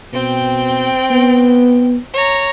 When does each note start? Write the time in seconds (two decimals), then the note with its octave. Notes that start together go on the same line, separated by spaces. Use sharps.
0.13 B2 C4 G5
1.11 B3
2.14 C#5 A#5